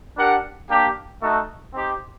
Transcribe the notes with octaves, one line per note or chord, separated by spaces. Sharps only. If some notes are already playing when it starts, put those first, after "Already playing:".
D4 G4 A#4 F#5
A#3 D4 G4
A3 D#4 F#4 A4
C4 D#4 G4